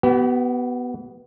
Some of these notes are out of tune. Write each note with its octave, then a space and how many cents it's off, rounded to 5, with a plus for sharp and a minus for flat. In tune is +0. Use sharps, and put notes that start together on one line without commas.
B3 +0 G4 -45